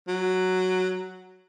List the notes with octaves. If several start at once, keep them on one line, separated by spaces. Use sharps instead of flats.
F#3